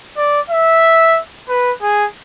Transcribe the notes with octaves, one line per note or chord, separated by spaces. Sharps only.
D5
E5
B4
G#4